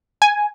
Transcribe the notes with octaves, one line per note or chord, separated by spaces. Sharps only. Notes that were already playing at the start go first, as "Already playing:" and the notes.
G#5